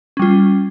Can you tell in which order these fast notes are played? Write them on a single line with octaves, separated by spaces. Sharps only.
C#4 G3 F4